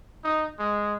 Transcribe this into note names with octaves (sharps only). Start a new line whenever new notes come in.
D#4
G#3